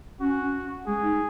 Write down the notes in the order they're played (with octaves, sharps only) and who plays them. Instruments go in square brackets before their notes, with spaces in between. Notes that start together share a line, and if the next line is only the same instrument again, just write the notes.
[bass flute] C#4 [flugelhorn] F#4
[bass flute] G#3 [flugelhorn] G#4
[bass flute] D#4